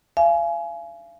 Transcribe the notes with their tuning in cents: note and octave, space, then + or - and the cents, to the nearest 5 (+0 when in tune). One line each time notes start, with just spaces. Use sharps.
F5 -40 G#5 +20